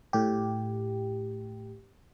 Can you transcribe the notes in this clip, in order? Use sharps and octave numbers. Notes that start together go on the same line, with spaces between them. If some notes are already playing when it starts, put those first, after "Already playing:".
A2 G4